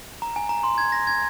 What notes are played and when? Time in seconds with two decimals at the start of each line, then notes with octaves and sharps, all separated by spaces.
0.22 A#5
0.36 G#5
0.49 A#5
0.63 C6
0.78 G#6
0.92 A#6
1.07 G#6